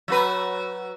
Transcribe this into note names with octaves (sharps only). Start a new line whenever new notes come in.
F#3 F#4 B4